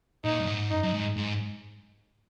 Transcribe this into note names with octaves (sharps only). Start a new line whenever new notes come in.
A#2 D#4
F#2
G#2
F#2 D#4
F#2
G#2
G#2